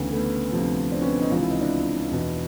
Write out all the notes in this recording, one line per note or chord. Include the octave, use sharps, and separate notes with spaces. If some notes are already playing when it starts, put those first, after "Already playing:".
Already playing: D2 C#3 E3 A3 B3
A3 B3
D2 C3 F3
C4 D4
B3 C#4
C#4 D#4
C#2 C3 E3 F4
E4
D#4
D4 E4
E2 B2